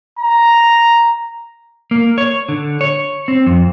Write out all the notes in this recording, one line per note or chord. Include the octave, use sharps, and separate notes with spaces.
A#5
A#3
C#5
D3
C#5
C4
F2